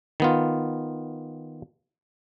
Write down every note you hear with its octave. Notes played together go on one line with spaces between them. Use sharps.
D#3 B3 F4